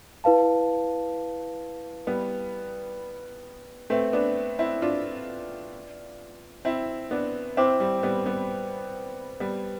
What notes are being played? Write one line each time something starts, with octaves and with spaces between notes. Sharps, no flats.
E4 B4 F5 A5
G3 B3
A3 C4 B4 E5 G5
B3 D4
C4 E4
D4 F4
C4 E4
B3 D4
C4 E4 C5 G5 D6
G3
G3 B3
G3 B3
G3 B3